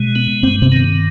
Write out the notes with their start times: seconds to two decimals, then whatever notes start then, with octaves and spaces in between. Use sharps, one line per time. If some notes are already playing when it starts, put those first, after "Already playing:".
Already playing: B2 G#3
0.15 B3
0.43 G2 C4
0.62 C3 C4
0.72 D#3